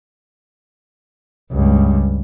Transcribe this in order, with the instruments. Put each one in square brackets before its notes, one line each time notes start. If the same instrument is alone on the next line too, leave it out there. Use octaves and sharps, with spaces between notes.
[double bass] C#2 G2